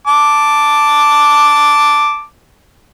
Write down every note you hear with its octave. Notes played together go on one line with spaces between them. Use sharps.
A5 D6